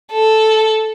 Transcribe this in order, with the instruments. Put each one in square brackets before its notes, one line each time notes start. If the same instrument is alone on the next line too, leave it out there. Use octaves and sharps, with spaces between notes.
[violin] A4